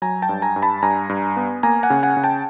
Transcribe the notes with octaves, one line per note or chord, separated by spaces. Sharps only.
F#3 G#5 A#5
G5 A5
G2
G#5 A#5
G2
A5 B5
G2 G#5 A#5
G2
B3
A#3 G#5 A#5
F#5 G#5
C#3
F#5 G#5
C#3
G5 A5